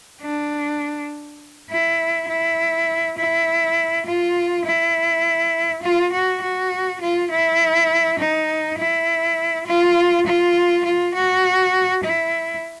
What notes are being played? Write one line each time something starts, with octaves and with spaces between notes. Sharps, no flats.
D4
E4
E4
E4
F4
E4
F4
F#4
F#4
F4
E4
D#4
E4
F4
F4
F4
F#4
E4